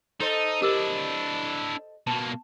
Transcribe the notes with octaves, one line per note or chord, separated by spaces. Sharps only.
D#4 A4 C5 D#5
D4 E4 G4 A#4 E6
B2 A#3 A5